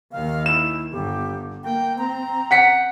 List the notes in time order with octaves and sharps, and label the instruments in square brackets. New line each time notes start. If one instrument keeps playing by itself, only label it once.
[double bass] D#2 D#3 [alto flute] F5
[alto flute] E4 [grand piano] E7
[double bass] G1 G2 [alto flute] G4
[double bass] A#3 [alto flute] G5
[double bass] C4 [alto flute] A#5
[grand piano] F#5 B6 C#7